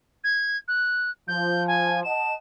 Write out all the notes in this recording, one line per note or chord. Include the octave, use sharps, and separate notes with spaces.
G#6
F#6
F3 G6
G#5
D#5 F#5 A5 E7